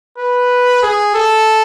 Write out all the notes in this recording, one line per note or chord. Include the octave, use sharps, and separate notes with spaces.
B4
G#4
A4